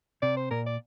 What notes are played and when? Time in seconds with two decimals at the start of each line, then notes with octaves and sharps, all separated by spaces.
0.22 C3 D5
0.37 C5
0.51 A#2 A#4
0.66 D5